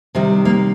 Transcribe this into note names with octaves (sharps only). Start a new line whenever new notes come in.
C3 D#3 G3
A#3